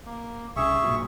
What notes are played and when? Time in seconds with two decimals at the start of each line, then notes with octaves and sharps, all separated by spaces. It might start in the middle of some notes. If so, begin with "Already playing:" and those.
0.06 A#3
0.56 C2 C#3 G#4 E5 C#6
0.81 B1 G2 A#2